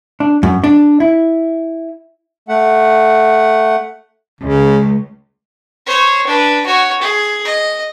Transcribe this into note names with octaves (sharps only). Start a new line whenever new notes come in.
D4
F#2
D4
E4
A3 F#5
C#2 C#3
C5 C#5
D4 B4
F#4 C#5
G#4
D#5